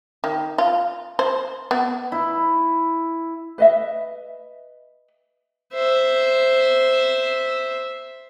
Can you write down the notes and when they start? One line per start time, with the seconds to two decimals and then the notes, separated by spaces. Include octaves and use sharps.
0.24 D#3
0.58 F4
1.19 C5
1.71 B3
2.12 E4
3.58 B4 D#5 E5
5.73 C5 E5